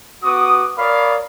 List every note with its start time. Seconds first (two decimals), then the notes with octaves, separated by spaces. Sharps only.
0.24 B3 F#4 D6 D#6
0.78 A#4 C#5 D5 F5 B5 D#6